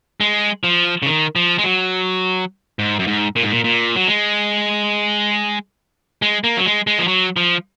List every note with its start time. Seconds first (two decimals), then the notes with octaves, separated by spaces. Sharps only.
0.21 G#3
0.64 F3
1.03 C#3
1.06 D#3
1.36 F3
1.58 G#3
1.64 F#3
2.79 G#2
2.99 F#2
3.07 G#2
3.36 A#2
3.43 G#2
3.52 A#2
3.64 A#2
3.96 F#3
4.07 G#3
6.22 G#3
6.44 A#3
6.57 F#3
6.65 G#3
6.87 G#3
6.99 F3
7.08 F#3
7.37 F3